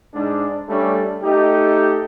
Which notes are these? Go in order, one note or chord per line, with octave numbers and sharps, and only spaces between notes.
G#2 D4
G3 A3 C#4 D4
A3 D#4 G4